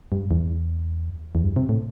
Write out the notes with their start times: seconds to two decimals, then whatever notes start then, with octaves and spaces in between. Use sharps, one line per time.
0.12 G2
0.31 E2
1.35 E2
1.44 G2
1.56 C3
1.69 A2